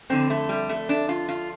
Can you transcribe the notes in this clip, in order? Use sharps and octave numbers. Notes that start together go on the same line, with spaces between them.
F2 D3 C4
A3
G3
A3
D4
F4
F4